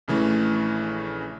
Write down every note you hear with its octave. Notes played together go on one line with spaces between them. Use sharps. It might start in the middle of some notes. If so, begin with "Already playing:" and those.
A#1 C#3 E3 A3